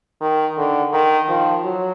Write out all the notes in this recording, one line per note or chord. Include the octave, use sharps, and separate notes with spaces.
D#3
D3
D#3
F3
F#3